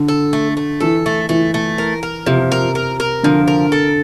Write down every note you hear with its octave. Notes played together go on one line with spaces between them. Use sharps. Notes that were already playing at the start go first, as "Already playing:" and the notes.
Already playing: D3
A4
A3
A3
E3 A4
A3
E3 A3
A3
A#4
A#4
C3 F3
A#4
A#4
A#4
D3 F3
A#4
A4